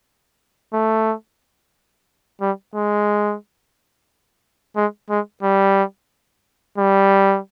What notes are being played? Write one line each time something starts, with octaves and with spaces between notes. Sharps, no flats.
A3
G3
G#3
G#3
G#3
G3
G3